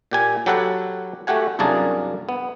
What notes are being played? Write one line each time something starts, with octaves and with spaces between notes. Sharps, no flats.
A#2 G4 G#5
F#3 G4 A4 B4 F#5
A3 F#4 G4 F#5 G#5
C2 F#2 A#3 D4 G#4 A5
B3